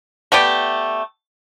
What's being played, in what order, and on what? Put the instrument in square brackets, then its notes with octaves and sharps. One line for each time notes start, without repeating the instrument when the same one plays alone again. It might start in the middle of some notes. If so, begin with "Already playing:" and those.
[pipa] A3 B3 G4 D5